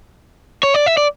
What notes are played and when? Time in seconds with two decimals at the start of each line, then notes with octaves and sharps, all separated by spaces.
0.63 C#5
0.74 D5
0.86 E5
0.97 D5